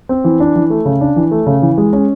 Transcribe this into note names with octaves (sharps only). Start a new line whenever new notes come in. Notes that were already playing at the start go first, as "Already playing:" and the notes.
C4
E3
D4
E3
A3
C#3
D4
E3
A3
C#3
E3
G#3
C#4